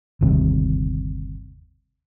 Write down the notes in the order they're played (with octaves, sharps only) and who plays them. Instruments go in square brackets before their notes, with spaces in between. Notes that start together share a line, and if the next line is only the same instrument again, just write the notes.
[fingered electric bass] G1 D#2 C3 G3